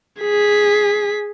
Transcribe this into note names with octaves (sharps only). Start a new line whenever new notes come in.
G#4 B6